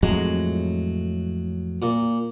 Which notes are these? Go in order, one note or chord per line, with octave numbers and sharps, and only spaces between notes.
F2 A2 F#3 G#3
A#2